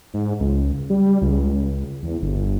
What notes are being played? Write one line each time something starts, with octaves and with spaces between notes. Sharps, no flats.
G#2
C#2
G3
C#2
E2
G1